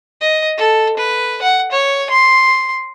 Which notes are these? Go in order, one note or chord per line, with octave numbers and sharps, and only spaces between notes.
D#5
A4
B4
F#5
C#5
C6